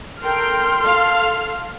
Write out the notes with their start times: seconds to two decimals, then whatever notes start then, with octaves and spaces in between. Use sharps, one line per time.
0.22 A4 A#4 G5 C6 F6
0.80 A4 F5